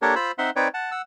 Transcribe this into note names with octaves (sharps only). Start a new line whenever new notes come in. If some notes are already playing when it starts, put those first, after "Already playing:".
A#3 D4 G4 A4 A#4 C#5
F4 C5 B5 E6
C4 D#4 E5 F#5 C6
C4 D#4 B4 C#5 D5 G5
F#5 A5
F#5 E6